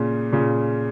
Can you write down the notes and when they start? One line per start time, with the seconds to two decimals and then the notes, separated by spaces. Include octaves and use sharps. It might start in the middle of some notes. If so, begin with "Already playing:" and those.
Already playing: A#2 C#3
0.32 A#2 C#3